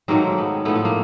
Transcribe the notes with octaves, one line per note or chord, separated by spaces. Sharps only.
G#2 D#3 F#3 A3 A#3 C4
B3
A2 F3 A3 B3
B3
A#3